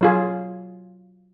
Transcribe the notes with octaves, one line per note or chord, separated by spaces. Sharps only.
F#3 F4 G#4